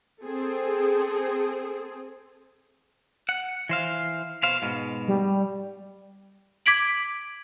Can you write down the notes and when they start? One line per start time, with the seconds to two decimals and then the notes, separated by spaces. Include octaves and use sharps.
0.22 C4 G#4 A4
3.29 F#5
3.69 E3 C5 F5
4.43 B2 C5 F5
4.62 G#2 B2
5.08 G3
6.66 D6 G#6 B6 D7 F#7